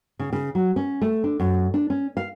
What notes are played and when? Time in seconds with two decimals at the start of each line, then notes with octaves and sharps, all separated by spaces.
0.19 C#3
0.33 C#3
0.55 F#3
0.76 C#4
1.02 A3
1.24 D4
1.40 F#2
1.74 D4
1.90 C#4
2.17 F5